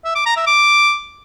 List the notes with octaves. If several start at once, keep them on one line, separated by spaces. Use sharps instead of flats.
E5
D6
A#5
E5
D6